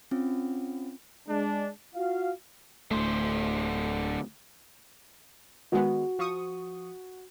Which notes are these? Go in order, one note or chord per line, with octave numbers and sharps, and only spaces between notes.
C4 C#4 F4
G#3 D4
F4 F#4 F5
D1 D3 A3 C5
D#3 G#3 B3 F#4
F3 C#6 D#6